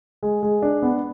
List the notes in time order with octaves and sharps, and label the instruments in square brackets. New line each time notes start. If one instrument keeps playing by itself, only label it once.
[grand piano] G#3
G#3
D4
B3